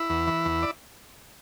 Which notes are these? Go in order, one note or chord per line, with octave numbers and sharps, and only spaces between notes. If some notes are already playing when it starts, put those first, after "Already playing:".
Already playing: E4
E2
E3
E2
D5